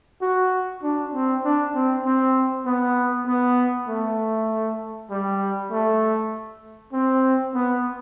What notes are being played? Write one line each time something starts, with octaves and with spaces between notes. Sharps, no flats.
F#4
D4
C4
D4
C4
C4
B3
B3
A3
G3
A3
C4
B3